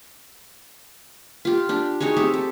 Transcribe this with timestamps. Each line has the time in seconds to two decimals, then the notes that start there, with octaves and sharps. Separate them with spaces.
1.45 F4 G4
1.69 D4 G4
2.00 D#4 F#4 G#4 C#5
2.17 C4 G4 E5
2.34 A4